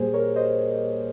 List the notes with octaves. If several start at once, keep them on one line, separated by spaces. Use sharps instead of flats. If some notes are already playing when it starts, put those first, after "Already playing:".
Already playing: A#2 G3 A#3 G4 G#4 C5
A#4 C#5
C5 D#5